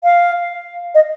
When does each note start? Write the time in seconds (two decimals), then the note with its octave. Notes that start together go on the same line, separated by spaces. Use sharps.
0.04 F5
0.95 D#5